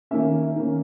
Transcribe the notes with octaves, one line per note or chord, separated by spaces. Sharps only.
D#3 A#3 C#4 E5
D#3 A#3 C#4